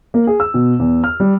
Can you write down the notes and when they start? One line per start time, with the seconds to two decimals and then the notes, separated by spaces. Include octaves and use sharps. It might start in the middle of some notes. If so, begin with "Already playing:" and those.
0.14 A#3
0.27 G#4
0.40 E6
0.54 B2
0.79 E2
1.04 F6
1.20 G3